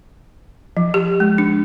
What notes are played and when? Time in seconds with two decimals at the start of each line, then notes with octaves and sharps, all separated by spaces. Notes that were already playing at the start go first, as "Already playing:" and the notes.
0.77 F3
0.94 G4
1.20 G#3
1.38 D4